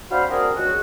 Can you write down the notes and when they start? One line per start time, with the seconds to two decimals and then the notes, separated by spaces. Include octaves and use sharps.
0.10 C4 D4 F#4 C5 F5 B5
0.30 C4 D4 F#4 G#4 A#4
0.55 C#2 F#4